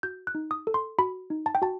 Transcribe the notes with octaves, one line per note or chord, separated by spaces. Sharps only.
F#4 G6
F#6
D#4
D#6
A4
C6
F#4 B5
D#4
A5
G5
F#4 A5